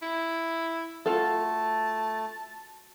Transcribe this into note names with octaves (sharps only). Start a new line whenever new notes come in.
E4
A3 F4 F#4 A4 A5